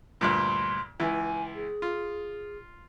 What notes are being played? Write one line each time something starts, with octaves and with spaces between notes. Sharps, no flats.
D2 G2 A#2 C6
C#2 E3 G#5
G#4
F4